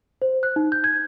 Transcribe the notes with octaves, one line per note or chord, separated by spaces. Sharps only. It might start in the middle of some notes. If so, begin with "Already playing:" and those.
C5
F#6
D#4
G6
G#6